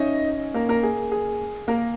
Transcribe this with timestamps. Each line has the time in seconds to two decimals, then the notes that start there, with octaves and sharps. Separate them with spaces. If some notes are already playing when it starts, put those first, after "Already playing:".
Already playing: C#4 D#4 C#5 D#5 E5
0.54 A#3 A#4
0.69 A#3 A#4
0.83 G#4
1.12 G#4
1.68 A#3 A#4